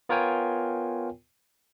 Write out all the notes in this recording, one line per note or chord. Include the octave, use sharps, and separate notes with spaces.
B3 F4 A#4 C#5 G5 G#5